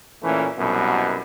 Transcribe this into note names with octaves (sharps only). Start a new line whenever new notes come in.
A#2 E3 A3 C#4
C2 F#2 B2